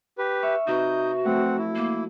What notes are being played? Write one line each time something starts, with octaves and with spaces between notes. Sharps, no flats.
G4 B4
E5 C#6 F6
C3 D#4 F#4 B4 D#6 G6
F3 F#3 A3 C4 F#5
E4
A#3